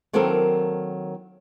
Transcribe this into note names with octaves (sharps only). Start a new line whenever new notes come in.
D#3 F#3 A#3 C4 A4 A#4